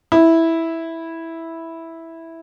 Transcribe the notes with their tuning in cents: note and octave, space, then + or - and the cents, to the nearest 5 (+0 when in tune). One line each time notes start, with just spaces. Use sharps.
E4 -5